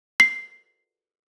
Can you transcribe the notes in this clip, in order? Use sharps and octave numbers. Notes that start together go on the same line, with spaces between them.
C7